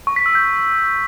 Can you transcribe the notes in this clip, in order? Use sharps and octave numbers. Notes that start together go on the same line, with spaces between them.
C#6
B6
E6
G6